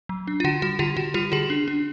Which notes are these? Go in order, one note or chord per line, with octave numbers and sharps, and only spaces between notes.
F#3
D4
F4
D3 F#4
G3 F#4
D3 F4 G4
D3 F#4
G3 F4 G4
D3 F#4 G#4
D4
D4